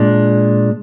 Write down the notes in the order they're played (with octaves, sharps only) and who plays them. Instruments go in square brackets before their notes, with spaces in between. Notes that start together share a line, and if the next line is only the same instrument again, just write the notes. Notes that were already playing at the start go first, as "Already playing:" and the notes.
Already playing: [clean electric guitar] A#2 G#3 D4